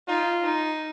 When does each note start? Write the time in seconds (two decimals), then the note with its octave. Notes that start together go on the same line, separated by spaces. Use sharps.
0.08 D#4 F4
0.44 D#4